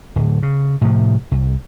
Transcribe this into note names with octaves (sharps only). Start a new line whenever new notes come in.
D1
C#3
A2 C3 F3
C2